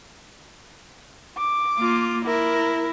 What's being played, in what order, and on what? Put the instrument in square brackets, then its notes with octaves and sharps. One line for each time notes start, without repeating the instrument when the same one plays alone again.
[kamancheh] D6
[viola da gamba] A#3 F4
[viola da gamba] E4 [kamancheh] A#4